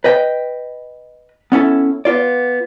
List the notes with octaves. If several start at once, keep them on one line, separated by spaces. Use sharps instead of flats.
B4 D#5 G5
B3 C#4 E4 A4
B3 F4 D5